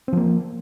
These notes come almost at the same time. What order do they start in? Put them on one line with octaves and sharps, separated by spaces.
C4 F3 A#3